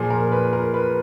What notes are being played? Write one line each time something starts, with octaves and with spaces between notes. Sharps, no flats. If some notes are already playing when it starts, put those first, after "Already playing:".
Already playing: A#2 F3 G#4
A#4
B4
A#4
B4